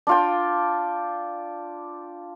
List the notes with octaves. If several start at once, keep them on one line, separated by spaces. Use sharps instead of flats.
D4 F4 G5